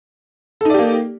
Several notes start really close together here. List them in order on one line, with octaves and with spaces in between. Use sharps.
A4 D#4 D5 G4 A#3